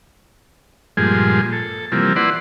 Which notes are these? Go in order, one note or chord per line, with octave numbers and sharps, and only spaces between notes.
G2 A#2 F3 G#3 G#4
A4
C3 E3 F3 G3 A#3
E4 B4 D5 F#5 C6